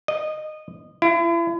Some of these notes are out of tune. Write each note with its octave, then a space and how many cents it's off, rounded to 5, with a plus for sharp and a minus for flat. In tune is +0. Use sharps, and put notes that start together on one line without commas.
D#5 -20
E4 +40